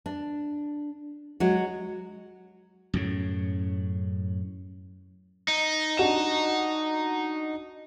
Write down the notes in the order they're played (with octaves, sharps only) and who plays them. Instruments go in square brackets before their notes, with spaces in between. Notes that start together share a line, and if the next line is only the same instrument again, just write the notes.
[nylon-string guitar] D4
F#3 G#3 F#4
[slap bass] F#2 A2 C#3
[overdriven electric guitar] D#4
[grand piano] D4 F#4 E7